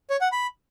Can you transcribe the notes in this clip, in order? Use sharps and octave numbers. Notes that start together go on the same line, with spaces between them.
C#5
F#5
B5